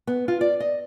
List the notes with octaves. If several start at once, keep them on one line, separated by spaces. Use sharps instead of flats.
B3
F4
D5
D#5